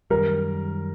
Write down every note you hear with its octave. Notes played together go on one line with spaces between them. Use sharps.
F#2 D#3 G3 A#4